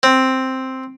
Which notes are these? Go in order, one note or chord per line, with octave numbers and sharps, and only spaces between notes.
C4